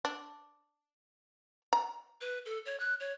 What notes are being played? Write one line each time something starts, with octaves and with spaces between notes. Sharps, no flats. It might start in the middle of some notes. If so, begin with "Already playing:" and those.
D4
A#5
B4
A4
C#5
F#6
C#5